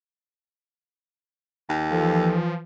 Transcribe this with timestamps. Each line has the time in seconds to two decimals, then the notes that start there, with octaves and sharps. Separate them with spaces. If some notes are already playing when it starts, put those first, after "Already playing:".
1.69 D#2
1.91 E3 F3 A4